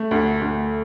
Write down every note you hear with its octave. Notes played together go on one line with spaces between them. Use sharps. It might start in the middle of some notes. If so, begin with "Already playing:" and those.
Already playing: A3
D2
D2